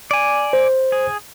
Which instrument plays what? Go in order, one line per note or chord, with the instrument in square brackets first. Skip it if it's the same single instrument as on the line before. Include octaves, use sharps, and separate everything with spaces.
[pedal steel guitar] D5 G#5
[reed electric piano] C5
[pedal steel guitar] G#4